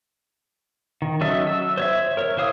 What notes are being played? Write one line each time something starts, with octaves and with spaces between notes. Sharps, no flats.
D#3
F#3 C#4 A4 D#5 E5
E6
C5 C#5 E5
A#4 C#5
E3 C5 F5 D#6 E6